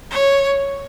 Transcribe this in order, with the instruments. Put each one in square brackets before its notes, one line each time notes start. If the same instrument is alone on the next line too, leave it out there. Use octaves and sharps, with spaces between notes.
[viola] C#5